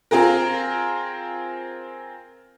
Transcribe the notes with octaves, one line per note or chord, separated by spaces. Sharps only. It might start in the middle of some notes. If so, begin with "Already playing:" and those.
C4 F4 G#4 A#4